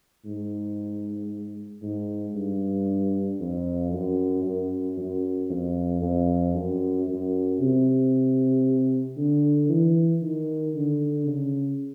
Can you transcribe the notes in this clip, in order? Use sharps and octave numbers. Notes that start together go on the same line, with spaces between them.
G#2
G#2
G2
F2
F#2
F#2
F#2
F2
F2
F#2
F#2
C3
D3
E3
D#3
D3
C#3